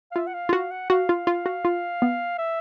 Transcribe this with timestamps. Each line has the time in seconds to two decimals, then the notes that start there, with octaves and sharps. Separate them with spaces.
0.11 F5
0.16 F4 E5
0.27 F#5
0.34 F5
0.49 F4
0.53 F#4 F5
0.71 F#5
0.90 F#4 F5
1.09 F4
1.27 F4
1.46 F#4
1.65 F4
2.02 B3
2.38 E5